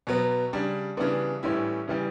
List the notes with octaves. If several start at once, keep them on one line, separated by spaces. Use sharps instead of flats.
B2 F#3 B3
C#3 G3 D4
C#3 E3 G3 B3 D4
A2 E3 G3 C#4 E4
C#3 E3 G3